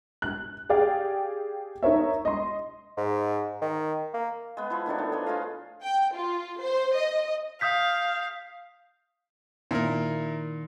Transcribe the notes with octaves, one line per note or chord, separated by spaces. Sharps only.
F#6
G4 G#4 D5 F5 G5
D#4 A#4 C#5 E5
D#5 C6
G#2
D#3
A#3
G#3 B3
F3 E4
A2 D#3 D4 C#5
A3
F3 B3
F4 G#4 D#5 F5
G5
F4
C5
D#5
F5 D#6 G6 B6
A#2 D#3 E4 A#4